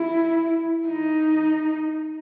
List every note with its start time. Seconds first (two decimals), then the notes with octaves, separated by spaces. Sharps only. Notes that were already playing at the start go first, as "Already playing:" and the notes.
Already playing: E4
0.88 D#4